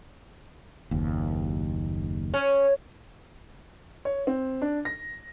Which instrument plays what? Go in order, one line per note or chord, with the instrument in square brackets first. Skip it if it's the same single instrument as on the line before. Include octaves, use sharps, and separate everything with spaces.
[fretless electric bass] F#1 D#2
[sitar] C#4
[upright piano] C#5
C4
D4
A#6